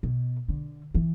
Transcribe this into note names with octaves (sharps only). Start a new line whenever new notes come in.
B2
D3
E3